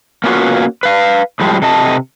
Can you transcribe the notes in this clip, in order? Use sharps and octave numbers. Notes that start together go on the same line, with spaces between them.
A#3 B3 C#4 F4 F#4
B4 F5
A2 F3 G3 G#3
C3 A4 D#5 A5